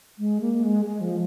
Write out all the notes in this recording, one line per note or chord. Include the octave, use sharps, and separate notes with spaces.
G#3
A#3
G#3
G#3
F3